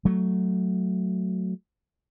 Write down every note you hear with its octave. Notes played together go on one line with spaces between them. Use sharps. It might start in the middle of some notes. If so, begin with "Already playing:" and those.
F#3 A3